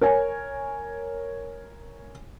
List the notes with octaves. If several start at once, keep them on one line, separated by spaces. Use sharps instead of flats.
A#4 C#5 G#5